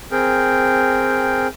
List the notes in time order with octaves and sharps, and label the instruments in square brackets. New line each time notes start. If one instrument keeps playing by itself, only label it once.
[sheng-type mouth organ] C4 G#4 A#4 G5